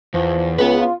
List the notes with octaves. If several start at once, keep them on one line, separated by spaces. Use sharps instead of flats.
E2 F3
C#2 C#3 B3 B4
F4